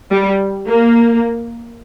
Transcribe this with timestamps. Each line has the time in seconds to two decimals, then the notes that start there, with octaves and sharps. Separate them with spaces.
0.12 G3
0.67 A#3